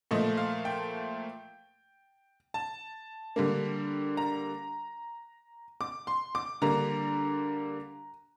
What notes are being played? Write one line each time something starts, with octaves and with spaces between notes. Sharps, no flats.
A#2 F3 A3 D#5
F5
G5
A5
D3 G3 A#3
A#5
D6
C6
D6
D3 G3 A#3 A#5